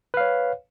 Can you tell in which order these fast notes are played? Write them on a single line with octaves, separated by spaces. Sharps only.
B4 F5 C#5